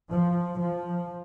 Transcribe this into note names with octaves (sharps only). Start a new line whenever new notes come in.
F3
F3